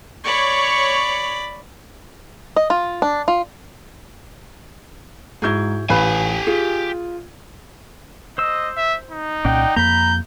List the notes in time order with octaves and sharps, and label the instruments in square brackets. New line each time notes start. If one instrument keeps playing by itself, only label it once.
[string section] C#5 C#6 [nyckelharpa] D5 B5
[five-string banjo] D#5
F4
D4
F4
[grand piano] G#2 G6 G#6 [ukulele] E4 F#4 G#4
[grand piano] A1 [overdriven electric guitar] G4 G#5 [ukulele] B4 F5 B5
[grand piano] F4 [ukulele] G#4
[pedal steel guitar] C5 E6 [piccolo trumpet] D#5
[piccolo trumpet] E5
D#4
[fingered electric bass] C2 A#2 C#4 [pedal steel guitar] D5 F#5 G5
[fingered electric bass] F2 A#3 [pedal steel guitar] A#5 B5 [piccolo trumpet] G6